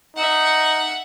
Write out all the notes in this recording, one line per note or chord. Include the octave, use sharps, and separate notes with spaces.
D#4 E5 F#5